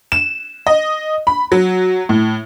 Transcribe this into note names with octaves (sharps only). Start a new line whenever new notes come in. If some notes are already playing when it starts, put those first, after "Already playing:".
E7
D#5
B5
F#3
A2